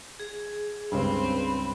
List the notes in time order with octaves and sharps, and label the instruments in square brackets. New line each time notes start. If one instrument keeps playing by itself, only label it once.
[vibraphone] G#4
[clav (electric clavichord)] C#2 G2 [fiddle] C4 [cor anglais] B4